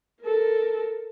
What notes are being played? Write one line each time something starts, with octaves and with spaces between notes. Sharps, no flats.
A4 A#4